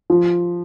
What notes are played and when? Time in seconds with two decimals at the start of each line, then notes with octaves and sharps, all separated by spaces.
0.10 F3